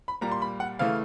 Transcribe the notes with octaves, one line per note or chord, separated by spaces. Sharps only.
B5
A#2 G3 A#3 A#5
C6
B5
F#5
C#3 E3 A3 F5